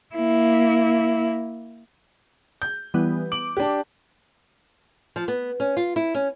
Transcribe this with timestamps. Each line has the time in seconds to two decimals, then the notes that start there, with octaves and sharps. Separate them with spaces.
0.15 A#3 E4
2.62 G6
2.94 E3 G3 B3
3.32 D6 F#7
3.57 D4 G4
5.16 F3
5.28 B3
5.60 C#4
5.77 F4
5.96 E4
6.15 C#4